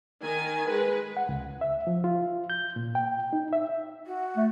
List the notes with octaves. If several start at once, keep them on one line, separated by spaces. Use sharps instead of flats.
D#3 G#5
G#3 B4
F#5
C#2
E5
F3
F4
G6
A#2
G5
D#4
E5
F#4
A3